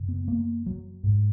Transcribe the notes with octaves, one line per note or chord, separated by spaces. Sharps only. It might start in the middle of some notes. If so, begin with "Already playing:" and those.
Already playing: F#2 C#3
B3
A#3
F#3
G#2